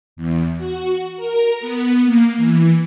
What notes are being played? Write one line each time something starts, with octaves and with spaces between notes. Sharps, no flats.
E2
F#4
A#4
B3
A#3
E3